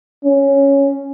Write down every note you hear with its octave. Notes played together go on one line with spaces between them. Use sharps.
C#4